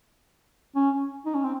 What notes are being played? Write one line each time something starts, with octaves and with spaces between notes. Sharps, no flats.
C#4
D#4
C#4
C4